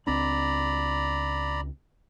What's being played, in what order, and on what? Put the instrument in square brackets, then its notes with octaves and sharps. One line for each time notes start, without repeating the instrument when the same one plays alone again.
[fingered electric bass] C#2 C4 D4 [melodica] D5 A#5 B5